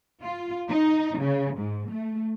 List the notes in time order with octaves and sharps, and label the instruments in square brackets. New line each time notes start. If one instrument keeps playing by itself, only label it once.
[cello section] F4
D#4
C#3
G#2
A3